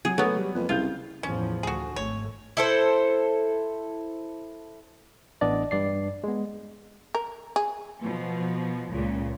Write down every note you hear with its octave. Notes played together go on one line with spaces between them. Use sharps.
F#3 G#4
F#3 A3 B3
G3
F2 A#3 B4
C2 C#3 F4 G6
E2 A2 F3 C#4
D2 F#4 G#4
G#1 A3 C#5
E4 A4 C5
A1 B3 D4 D5 D#5
G2 D5 C7
G#3 B3
A#4
G#4
B2 F3
C#2 A#2 C#3